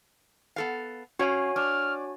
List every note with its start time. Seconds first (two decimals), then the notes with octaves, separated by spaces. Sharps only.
0.56 B3 A4 F5
1.19 C#4 F#4 C#5 F5 G#5
1.56 D4 F6